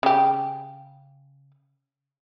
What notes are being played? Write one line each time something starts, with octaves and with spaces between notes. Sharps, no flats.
C#3 G4